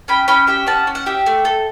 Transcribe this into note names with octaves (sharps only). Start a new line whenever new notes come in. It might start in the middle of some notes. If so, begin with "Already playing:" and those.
C#4 G5 B5
C#4 G5 B5
G4 E5 G5
C#4 F#5 A5
C#4
F#5
G4 E5 G5
A3
A4